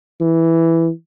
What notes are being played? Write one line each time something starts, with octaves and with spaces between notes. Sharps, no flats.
E3